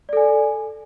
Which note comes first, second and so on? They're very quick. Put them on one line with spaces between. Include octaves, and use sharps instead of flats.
D5 A4 G#5